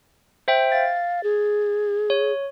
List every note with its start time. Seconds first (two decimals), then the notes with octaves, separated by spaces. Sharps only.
0.48 C5 E5 G5
0.72 F5 A6
1.24 G#4
2.10 C#5